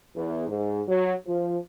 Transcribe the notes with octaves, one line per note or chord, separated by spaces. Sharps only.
E2
G#2
F#3
F3